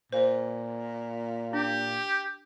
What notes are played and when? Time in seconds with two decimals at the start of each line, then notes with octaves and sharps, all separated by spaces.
0.13 A#2 C5
1.53 D4 G4